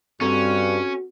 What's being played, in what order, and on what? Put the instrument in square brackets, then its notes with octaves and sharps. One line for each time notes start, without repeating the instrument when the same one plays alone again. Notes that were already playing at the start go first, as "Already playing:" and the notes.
[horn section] G2 [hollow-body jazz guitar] C4 A4 A#5 [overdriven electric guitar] C#4 [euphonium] F#4